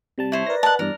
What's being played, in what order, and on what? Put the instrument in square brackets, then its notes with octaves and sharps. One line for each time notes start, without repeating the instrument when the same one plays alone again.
[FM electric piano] C3 G3 A5
[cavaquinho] E4 C5 C#5
[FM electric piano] A#4 A#6 [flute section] B4 D5
[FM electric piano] A#4 D#5 [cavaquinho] F#5 A5
[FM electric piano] E2 G2 [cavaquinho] A#4 [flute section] D5